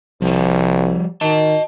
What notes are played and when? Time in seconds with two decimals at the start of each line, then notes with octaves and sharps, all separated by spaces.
0.22 C2 F3 G3
1.21 D#3 D#5 A5